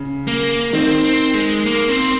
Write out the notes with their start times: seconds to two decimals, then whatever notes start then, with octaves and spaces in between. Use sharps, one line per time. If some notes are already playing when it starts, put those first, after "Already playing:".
Already playing: C#3
0.27 A#3
0.73 D#3 C4
1.04 C4
1.34 G#3
1.66 A#3
1.89 C4